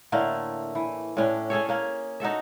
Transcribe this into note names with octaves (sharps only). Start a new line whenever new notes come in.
A2 D3 A3 A#3
E3
A2 C#4 D4
C#4 G#4 A4 C#5
A#3 C#4
D#4 F#4 A4 E5